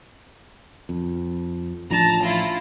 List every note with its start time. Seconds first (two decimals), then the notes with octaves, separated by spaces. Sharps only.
0.89 F2
1.90 A1 F3 D4 A5 A#5
2.23 E4 F4